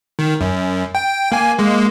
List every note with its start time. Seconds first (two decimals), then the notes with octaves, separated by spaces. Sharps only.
0.19 D#3
0.41 F#2
0.95 G5
1.32 A#3 G#5
1.58 G#3 A#3